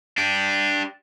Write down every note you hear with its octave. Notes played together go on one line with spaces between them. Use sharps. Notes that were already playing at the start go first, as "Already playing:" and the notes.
D4 G4